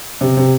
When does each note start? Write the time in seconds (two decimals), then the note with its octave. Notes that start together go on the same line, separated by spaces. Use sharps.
0.21 C3
0.37 C3